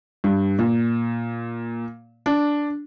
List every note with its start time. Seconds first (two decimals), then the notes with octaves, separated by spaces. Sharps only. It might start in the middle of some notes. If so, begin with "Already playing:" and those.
0.24 G2
0.59 A#2
2.26 D4